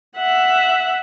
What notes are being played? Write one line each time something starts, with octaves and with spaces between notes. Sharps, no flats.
E5 F#5